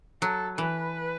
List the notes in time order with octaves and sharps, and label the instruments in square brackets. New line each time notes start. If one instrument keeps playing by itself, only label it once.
[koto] F#3 [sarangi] A4
[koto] E3 [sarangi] B4